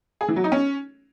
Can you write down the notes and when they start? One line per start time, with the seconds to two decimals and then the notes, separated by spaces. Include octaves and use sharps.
0.21 G#4
0.28 E3
0.36 F#3
0.44 D#4
0.52 C#4